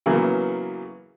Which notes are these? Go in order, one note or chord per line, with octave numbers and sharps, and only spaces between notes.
C#3 E3 F#3 A#3 B3